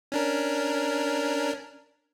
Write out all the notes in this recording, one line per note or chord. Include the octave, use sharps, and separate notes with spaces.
C#4 D4 A#4